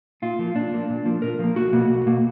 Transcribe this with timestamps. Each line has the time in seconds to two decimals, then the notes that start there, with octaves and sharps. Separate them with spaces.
0.22 A#2 F4
0.39 F3 A#3
0.55 A#2 D4
0.72 F3 A#3
0.90 A#2
1.05 F3 A#3
1.22 A#2 A#4
1.39 F3 A#3
1.55 B1 F#4
1.73 B2 A#3
1.90 B1
2.06 B2 A#3